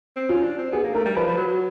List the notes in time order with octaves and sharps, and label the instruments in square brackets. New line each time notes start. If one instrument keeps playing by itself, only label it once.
[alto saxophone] C4
[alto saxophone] C#4 [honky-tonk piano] F4
[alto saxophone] D4
C4
[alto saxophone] B3 [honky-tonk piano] G#4
[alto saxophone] A#3
[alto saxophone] A3 [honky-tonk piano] A#4
[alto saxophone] G3
[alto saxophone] F3 [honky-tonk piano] B4
[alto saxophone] F3
F#3
F#3